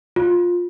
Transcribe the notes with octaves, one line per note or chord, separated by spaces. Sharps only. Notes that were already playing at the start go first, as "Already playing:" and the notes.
F4